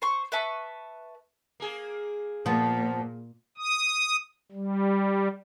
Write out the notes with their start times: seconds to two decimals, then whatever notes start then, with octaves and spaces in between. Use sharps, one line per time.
0.02 C5 C#6
0.32 B4 E5 A5 C#6
1.60 A#3 G#4
2.46 A#2 F3 B3
3.58 D#6
4.52 G3